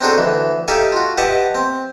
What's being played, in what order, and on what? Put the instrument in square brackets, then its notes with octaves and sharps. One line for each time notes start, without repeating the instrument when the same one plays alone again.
[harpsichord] C4 D4 D#4 F#4 G#4 A4
D2 E3
D#4 G4 A4 E5 F5 G#5
F4 F#4
G4 B4 D#5 E5 F#5 A5
C4